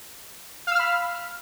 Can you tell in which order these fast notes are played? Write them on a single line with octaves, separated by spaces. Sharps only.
F5 E6 F6 B5